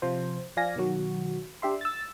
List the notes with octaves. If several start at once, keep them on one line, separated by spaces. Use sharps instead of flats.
C3 F3 C5
F3 D5 F5 G#5 A#6
B2 D#3 F#3 F#4
D4 G4 E5 C6
E6 A6